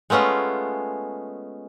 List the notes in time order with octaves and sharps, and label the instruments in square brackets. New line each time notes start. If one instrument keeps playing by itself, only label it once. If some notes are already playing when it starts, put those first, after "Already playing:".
[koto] G#3 A3 B3 C#4 F4